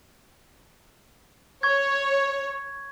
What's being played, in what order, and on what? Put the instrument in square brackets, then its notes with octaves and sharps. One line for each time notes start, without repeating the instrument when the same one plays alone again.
[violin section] C#5 [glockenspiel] C#6 G#6